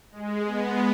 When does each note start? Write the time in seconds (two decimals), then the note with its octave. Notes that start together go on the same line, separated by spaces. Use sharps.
0.12 G#3
0.47 B3